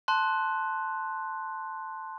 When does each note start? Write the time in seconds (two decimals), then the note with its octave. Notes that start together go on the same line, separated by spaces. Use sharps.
0.08 A5 C6 F#6